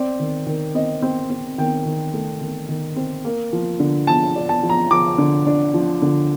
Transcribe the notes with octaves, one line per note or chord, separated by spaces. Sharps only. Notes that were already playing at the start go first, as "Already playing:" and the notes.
Already playing: C4 D5
D#3
D#3
C4 D#5
C4
C4
D#3 G5
D#3
A3
D#3
D#3
C4
A#3
F3
D3
F3 A5
D4
A5
F3
A#5
F3 D6
D3
D4
F3
D3